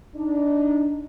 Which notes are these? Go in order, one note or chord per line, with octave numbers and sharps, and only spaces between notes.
D4 D#4